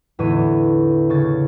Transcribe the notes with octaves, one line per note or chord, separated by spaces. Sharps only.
E2 A2 D3 C#5 D#7
C#3 C#5 A6